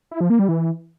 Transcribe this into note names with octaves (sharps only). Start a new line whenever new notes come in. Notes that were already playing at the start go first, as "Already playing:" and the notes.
E4
F3
A#3
G3
E3